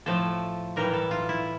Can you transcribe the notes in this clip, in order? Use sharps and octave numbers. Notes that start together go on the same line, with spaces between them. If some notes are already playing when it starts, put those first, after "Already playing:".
A2 F3 A3 A4
A2 E3 G3 A#4
A4
F4
E4